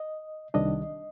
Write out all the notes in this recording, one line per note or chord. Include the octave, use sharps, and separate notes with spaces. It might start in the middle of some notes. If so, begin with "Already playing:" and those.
Already playing: D#5
C2 C3 D#3 G3 D4 D#5